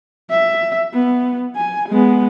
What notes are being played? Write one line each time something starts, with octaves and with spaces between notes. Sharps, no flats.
E5
B3
G#5
G#3 B3